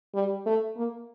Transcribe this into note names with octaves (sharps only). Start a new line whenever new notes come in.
G3
A3
A#3